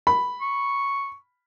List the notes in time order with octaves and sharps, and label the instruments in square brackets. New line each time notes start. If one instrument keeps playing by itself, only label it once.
[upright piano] B5
[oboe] C#6